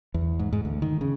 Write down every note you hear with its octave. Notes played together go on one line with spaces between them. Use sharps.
E2
G#2
G#2
D2
D#3
C#3